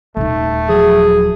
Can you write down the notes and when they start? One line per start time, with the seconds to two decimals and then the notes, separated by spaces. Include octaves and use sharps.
0.17 D#1 A3 D#4
0.69 F3 F#3 G#4